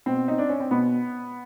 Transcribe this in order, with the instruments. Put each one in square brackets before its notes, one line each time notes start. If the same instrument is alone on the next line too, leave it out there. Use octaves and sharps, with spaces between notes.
[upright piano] B2 C4
D#4
D4
C#4
C4
B2 B3